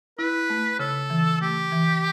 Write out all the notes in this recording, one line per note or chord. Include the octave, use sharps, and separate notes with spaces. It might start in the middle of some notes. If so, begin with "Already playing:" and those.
E4 B4
A3
C#3 A4
E3
A3 G4
E3